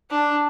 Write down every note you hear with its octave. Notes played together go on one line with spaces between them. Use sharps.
D4